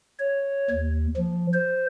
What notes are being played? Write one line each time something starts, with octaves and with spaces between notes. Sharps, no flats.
C#5
D#2
F3
C5